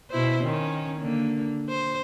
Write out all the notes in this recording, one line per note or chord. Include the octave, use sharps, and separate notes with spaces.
B2 E4 C5
D#3 C#4
D3 A#3
C5